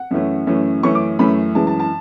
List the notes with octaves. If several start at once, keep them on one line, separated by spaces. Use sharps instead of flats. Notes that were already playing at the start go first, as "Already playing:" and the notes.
Already playing: F#5
F#2 E3 A3 C#4
F#2 E3 A3 C#4
F#2 E3 A3 C#4 C#6
D6
F#2 E3 A3 C#4 B5
F#2 E3 G#3 A5
A5
A5